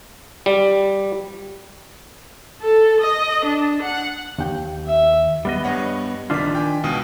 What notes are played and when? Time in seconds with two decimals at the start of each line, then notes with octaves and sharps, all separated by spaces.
0.46 G3
2.61 A4
3.01 D#5
3.45 D4
3.83 F#5
4.38 D#2 G5
4.86 E5
5.45 G3 B3 D#5
5.64 G2 C#5 F#5
6.30 A#1 D#3 D4 F4 B6
6.55 G5 G#5
6.84 C#2 B2 D#6